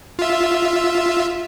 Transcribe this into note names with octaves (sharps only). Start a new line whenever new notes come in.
F4 E5